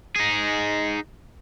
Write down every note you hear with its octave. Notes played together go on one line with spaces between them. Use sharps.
D#4 G#4